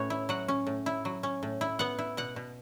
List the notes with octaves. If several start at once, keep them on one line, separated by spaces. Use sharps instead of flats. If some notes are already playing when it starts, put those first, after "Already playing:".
Already playing: A2 C#4 B4 C#5
E4
F#3 F#5
C#4
A2
E4
F#3
C#4
A2
E4
B3 F#5
E4
B2 F#5
B2